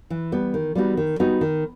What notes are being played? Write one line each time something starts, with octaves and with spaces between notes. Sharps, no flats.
E3
G3 B3
D#3
G3 B3 D#4 F#4
D#3
G3 B3 D#4 F#4
D#3